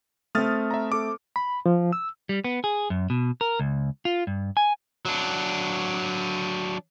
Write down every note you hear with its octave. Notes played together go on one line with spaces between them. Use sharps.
A3 C4 D#6 F6 A6
E5 A#5
A4 D6
B5
F3
E6
G3
B3
G#4
F#2
B2
A#4
C#2
F4
G2
G#5
F#3 D4